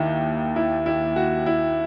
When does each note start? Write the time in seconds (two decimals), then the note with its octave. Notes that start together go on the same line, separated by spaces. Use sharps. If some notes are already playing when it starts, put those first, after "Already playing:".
Already playing: D#2 D#4 E4
0.56 E4
0.86 E4
1.16 F#4
1.46 E4